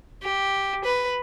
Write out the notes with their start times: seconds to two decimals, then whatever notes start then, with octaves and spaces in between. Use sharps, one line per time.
0.23 G4
0.84 B4